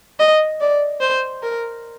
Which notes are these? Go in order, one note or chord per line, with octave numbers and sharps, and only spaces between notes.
D#5
D5
C5
A#4